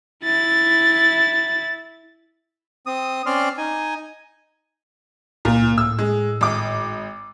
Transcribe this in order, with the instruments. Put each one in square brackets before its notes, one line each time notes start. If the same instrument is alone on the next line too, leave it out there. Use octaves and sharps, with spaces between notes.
[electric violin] E4 A6
[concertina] C4 D#6
C4 C#4 D5 C6 F6
D#4 G#5
[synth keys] C#2 A#3 [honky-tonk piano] A#2
[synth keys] A2 [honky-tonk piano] E6
[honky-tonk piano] G#3
G#1 D6